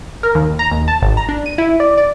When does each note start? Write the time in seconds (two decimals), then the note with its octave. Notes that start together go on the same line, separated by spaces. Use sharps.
0.23 A#4
0.35 D#2
0.59 A#5
0.71 D#2
0.88 A5
1.02 G#1
1.17 A#5
1.29 D4
1.46 D#7
1.58 E4
1.80 D5
1.97 D5